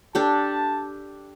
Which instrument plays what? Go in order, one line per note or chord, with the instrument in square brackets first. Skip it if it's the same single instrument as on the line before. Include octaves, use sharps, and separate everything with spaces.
[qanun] D4 G4 A4 [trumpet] A5